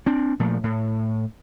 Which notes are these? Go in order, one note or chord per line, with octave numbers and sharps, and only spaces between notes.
C4 D4
A#2 F3 A3
A2